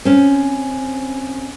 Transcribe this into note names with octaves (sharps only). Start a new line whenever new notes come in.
C4 C#4